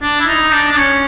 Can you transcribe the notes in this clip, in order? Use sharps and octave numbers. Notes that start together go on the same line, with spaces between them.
D4
E4
D#4
D4
D4
C#4